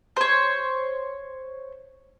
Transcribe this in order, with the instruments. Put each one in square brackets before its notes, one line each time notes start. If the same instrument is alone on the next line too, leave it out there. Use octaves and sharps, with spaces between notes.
[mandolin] C5 C#5